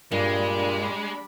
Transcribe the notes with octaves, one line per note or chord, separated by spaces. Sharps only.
G2 A#2 G3 G#3 D4 B5